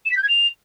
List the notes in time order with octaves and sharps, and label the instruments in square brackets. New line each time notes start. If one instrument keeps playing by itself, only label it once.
[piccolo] E7
B6
G6
G#6
F7